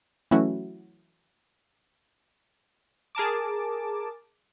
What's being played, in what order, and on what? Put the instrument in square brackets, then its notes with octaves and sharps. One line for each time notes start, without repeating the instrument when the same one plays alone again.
[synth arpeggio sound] E3 F#3 A3 C#4 E4 F#4
[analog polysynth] G#4 A#4 A5 D6